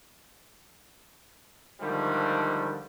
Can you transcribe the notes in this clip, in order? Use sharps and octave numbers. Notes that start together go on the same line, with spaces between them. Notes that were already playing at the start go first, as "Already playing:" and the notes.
G#2 D3 D#3 F3 G3 A3